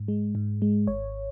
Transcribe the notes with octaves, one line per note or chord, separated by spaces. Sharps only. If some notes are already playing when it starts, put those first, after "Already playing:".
Already playing: G#2
G#3
G#2
G#3
G#1 C#5